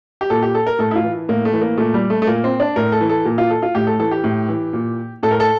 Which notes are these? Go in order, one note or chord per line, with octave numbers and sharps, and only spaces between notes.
G4
A#2 A4
G4
A4
A#4
A2 A4
E4
F4
E3
A2 A#3
A3
E3
A#3
A#2 A3
G3
A3
A3
A#2 A#3
C4
D4
A2 A#4
A4
E3
A4
A#2
F4
A4
F4
A2 G4
A4
E3 A4
G4
A2
E3
A#2
A2 A4
A#4
A4